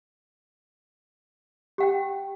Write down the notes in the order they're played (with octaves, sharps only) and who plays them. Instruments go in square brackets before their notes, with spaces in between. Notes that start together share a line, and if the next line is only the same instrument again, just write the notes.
[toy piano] G4 F#5 G5